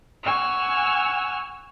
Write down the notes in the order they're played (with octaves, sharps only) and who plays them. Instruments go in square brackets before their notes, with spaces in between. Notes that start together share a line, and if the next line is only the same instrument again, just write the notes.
[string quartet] F#5 G#5 C#6 E6 F6